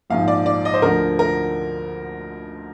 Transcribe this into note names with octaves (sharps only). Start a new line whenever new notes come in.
A#1 G#2 F3 F5
D5
D5
D#5
C5
D2 D3 F3 A#4
A#4